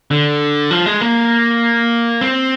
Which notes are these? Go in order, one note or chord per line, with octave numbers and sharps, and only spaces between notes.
D3
F3
G#3
A#3
C4